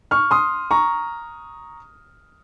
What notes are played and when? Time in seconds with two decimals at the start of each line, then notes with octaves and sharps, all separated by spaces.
0.11 C#6 F6
0.31 C6 D#6
0.71 A#5 C#6